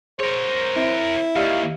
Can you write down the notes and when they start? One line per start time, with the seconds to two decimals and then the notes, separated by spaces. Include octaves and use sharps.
0.20 G#4 A#4 C5 C#5
0.76 C4 E4
1.36 D#2 G4 D5 D#5 F5